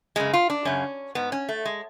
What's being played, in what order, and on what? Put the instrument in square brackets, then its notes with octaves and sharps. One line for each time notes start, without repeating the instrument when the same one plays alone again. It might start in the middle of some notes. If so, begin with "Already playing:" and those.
[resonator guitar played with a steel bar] F#2 C#3 G#3
F4
D4
F#2 C#3 C#4
G#2 B3
C#4
A3
G#3